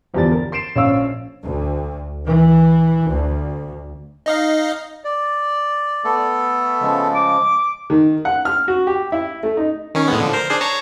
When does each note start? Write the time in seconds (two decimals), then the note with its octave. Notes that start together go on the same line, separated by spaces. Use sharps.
0.14 G1 E2 F3 G4 D5 A6
0.32 A#4
0.52 C6 C7 D7 E7
0.76 A#1 C#4 C#5 F5 E6
1.45 D2
2.27 E3
3.09 D2
4.26 D#4 D#5 F5
5.04 D5
6.04 A3 B3 A4
6.81 C#3 F3 G#3
7.15 D6
7.90 D#3
8.25 F#5
8.45 F6
8.68 F#4
8.87 G4
9.12 E4
9.43 A3
9.57 D#4
9.95 D#3 C#4
10.08 A2 G#3 B3
10.20 D3 F3
10.33 A#4 C5
10.50 D4 G#4 C5
10.61 C#5 A5 A#5